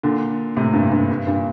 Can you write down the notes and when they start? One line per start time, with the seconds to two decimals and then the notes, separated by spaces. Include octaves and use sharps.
0.03 A#2 D3
0.57 A2 C3
0.73 G2 A#2
0.92 G2
1.10 G2
1.27 G2 A#2